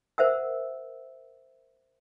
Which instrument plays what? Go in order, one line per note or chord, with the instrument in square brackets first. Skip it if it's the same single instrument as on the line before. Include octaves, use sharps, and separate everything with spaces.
[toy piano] A#4 C5 E5 F#5 E6